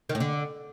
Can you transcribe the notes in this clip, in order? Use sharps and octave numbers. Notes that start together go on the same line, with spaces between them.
D#3
A2
D3